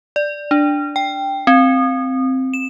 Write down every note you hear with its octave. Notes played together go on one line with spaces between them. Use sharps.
D5
D4
G5
C4
E7